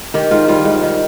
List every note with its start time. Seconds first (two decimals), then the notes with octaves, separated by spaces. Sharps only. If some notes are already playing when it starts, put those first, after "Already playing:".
0.14 D#3 G4
0.31 G#2 F4
0.48 G3 F4
0.65 G#2
0.82 D#3